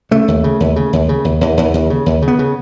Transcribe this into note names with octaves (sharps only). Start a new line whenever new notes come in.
C#3 A3
D#2
C#3
D#2
C#3
D#2
C#3
D#2
D#2
D#2
D#2
C#3
D#2
C#3
B3
C#3